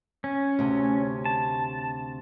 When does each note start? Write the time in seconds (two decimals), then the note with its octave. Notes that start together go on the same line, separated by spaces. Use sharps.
0.24 C#4
0.59 D2 C3
1.25 A5